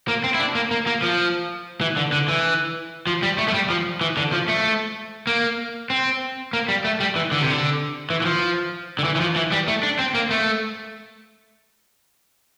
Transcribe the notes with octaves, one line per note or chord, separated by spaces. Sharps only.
A#3
C4
E4
D4
A#3
A#3
A#3
F3
E3
D3
D3
E3
F3
G3
A3
A3
G3
F3
E3
D3
F3
A3
A#3
C4
A#3
G3
A3
G3
E3
D3
C3
D3
E3
E3
F3
D3
E3
E3
F3
E3
G3
A3
D4
C4
A#3
A3